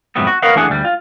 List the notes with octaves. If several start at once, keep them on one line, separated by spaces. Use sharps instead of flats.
F2 G#2 C3 F#3 G3 B3
F#4
A#4 B4 C#5 D#5 F5 F#5
E3 A3 D4 G#4 F#5
D2 G3
F4